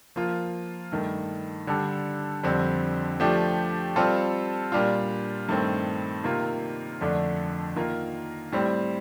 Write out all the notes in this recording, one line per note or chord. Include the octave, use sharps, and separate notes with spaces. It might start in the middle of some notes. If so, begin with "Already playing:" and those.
F3 A#3 F4
G2 D#3 A3
D3 G3 D4 A4
F2 D3 G3 C4
F3 A3 D4 G4
G3 C4 F4 A4
A#2 G3 D4 F4
G2 D#3 A3 C4
C3 D#3 A#3 F4
F2 D3 A3 D4
D#3 A#3 F4 A#4
A2 G3 C4